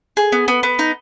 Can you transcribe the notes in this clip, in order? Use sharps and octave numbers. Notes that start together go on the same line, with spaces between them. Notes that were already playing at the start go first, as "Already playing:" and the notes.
G#4
B3
B3
B3
D#4